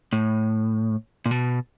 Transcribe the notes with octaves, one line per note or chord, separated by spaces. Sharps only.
A2
A#2
B2